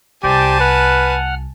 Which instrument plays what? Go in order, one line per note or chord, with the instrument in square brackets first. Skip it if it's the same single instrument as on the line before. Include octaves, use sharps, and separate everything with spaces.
[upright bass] C2 [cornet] G4 [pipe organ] C5 D5 [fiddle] G#5 A5
[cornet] B4 [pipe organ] F#5 F6